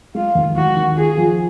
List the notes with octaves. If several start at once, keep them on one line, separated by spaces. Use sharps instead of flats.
G#3 F4
D#2
D#2 F#4
D#3
F4 G#4
F3